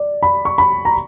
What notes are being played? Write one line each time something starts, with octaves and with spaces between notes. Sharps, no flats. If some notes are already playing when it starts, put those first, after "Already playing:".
Already playing: D5
B5
C#6
B5
A#5